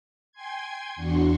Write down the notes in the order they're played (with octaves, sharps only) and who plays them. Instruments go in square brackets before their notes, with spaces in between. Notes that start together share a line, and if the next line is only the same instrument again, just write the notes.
[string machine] G5 G#5 C6 G#6
E2 D4 F#4 C6 C#6